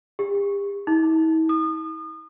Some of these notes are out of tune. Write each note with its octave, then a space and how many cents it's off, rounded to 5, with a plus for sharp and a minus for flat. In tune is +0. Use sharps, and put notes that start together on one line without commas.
G4 +40
E4 -45
D#6 -35